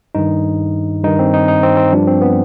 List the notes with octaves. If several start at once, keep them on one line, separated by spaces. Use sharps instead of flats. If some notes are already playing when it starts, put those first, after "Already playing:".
G2 D#3 D#4
G2 D#3 D#4
C4
D#4
D#4
C4
C4
G2 F3 D4
C4
B3